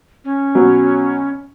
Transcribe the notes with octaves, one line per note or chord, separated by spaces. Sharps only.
C#4
B2 F#3